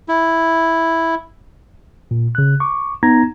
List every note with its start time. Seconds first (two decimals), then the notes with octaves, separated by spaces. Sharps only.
0.09 E4
2.11 A#2
2.35 C#3 F#6
2.60 C#6 D6
3.03 B3 D#4 A#5 G#6 A#6